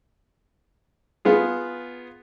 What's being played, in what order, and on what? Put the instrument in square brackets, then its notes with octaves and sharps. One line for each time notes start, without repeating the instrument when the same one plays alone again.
[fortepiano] B3 F4 G#4